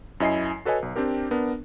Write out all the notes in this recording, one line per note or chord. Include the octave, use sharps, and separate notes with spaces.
F#2 E4 D#5 G#5 C7
F#4 A4 B4 C#5 D#5 G#5
B1
C4 D4 G4 A#4
B3 D4 A#4